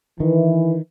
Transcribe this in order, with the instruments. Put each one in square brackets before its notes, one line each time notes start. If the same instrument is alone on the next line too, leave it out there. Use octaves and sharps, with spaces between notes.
[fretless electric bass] D#3 [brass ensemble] E3